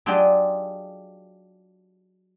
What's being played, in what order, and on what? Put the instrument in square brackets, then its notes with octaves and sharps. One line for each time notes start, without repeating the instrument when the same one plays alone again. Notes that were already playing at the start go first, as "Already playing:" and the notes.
[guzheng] F#3 D4 F4 G4 G#4 D#5